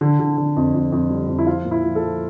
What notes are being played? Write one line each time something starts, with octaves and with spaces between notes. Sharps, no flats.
D3
D3
D3
F2
F2
F2
G3
F2
E4
F3 F4
A#2
E4
F3
A4
F3